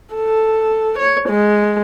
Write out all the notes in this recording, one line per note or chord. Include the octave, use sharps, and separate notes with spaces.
A4
C#5
G#3